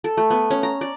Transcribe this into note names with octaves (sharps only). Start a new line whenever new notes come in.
A4
A3
B3
C#4
A#5
D5